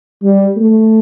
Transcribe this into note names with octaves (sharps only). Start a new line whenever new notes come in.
G3
A3